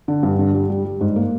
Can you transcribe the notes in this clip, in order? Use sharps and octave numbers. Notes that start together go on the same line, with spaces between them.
D3
G2
D3
G3
G3
G3
G#2
A#3